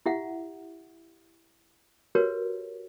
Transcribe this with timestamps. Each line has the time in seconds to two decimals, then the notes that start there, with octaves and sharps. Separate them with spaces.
0.06 E4 G4 E5 F#5
2.15 F#4 G4 A#4 B4 C#5